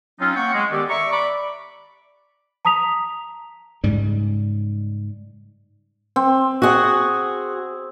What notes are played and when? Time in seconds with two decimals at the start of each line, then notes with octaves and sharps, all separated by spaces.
0.20 F#3 C4 C#4 D#4 F4
0.36 A#3 F#5 G5 C#6
0.53 G#3
0.71 D#3 B3 G4 A4 D5
0.89 D5 E5 A#5 C#6
1.12 D5 B5 D6
2.65 A5 A#5 D#6 B6 F7
3.84 G#2 C#3 G3
6.16 C4
6.62 F#4 G#4